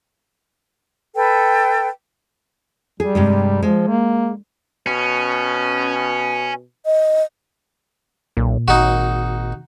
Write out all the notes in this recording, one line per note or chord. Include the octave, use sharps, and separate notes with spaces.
A4 B4 G5
G3 G#4
G2 C3 G#3
F3 G#3
A#3
B2 C#4
D#5
B1 A#2
G#1 D#4 F#4